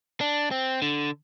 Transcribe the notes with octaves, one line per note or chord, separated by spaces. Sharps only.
D4
C4
D3